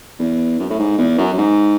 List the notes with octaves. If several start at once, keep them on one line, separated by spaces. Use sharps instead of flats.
E2
F#2
A2
G#2
E2
F#2
F#2
G#2